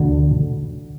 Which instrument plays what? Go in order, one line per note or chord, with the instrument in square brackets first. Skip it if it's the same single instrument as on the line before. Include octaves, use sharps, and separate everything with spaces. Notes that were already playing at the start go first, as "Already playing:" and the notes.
Already playing: [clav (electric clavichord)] D2 D3